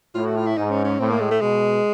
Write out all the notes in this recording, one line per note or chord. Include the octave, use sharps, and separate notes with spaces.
A2 F4
F#4
F4
E4
G#2 D#4
C#4
C#4
A2 C4
A#3
G#3
A3
B2 G#3